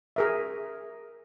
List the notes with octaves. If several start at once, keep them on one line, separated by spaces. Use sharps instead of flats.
G#4 A#4 E5